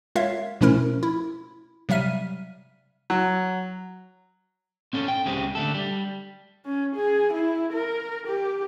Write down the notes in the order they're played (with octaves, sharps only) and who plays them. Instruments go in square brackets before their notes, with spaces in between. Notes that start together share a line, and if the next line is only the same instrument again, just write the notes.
[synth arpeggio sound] G#3 F4 A#4 C#5 E5 F5
B2 F3 A3 C#4 E4 A#4
E4
C3 F#3 G3 E5 F6 D#7
[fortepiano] F#3
[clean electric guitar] C4 C#4 A4
G5
C#2 C#3 G#3 C4 G4
D3 A3 A4
G3
[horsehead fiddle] C#4
G#4
E4
A#4
G4